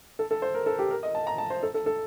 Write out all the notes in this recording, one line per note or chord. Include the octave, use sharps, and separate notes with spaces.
A4
A4
C5
A#4
A4
G4
A#4
D#5
A5
A#5
A5
C5
A4
A4
A4